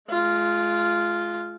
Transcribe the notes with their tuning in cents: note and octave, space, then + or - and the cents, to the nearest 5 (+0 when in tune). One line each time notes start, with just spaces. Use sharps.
G#3 +35 F4 -5